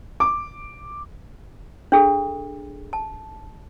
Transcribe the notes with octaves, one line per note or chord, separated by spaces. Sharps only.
D6
D4 G#4 A4
A5